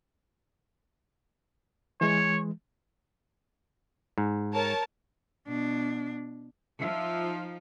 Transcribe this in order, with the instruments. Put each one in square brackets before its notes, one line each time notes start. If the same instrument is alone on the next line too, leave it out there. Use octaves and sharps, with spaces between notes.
[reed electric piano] E3 G#3 [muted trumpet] C#5
[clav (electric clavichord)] G#2
[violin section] A#4 C#5 A5
[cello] B2 D4
[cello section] F3 D#4 F4 [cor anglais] E5